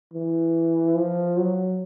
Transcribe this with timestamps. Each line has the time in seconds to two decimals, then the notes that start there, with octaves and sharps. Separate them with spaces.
0.14 E3
0.96 F3
1.37 F#3